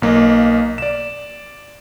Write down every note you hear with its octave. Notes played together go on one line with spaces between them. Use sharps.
B1 A#3 D#5
D5 E7